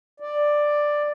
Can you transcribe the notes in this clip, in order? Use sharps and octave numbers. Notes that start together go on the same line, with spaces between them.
D5